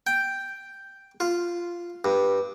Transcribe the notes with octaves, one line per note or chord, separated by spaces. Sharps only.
G5
F4
G2